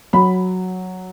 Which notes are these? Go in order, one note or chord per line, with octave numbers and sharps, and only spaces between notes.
F#3 B5